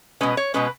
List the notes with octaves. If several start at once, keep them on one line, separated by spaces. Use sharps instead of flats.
B2 G#3 C#4 B4
C#5
B2 G#3 C#4 B4